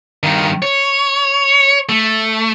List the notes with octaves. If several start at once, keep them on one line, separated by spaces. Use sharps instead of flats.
G2 D#3
C#5
A3